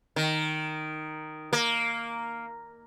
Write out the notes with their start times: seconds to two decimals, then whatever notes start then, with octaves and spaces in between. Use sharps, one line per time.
0.16 D#3
1.53 A#3